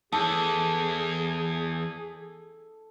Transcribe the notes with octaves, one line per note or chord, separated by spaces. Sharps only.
E2 G#4 A4